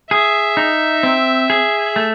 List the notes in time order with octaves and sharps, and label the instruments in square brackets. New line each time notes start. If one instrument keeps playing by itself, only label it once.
[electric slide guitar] G#4 [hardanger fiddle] E5
[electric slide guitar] D#4
C4
G#4
A3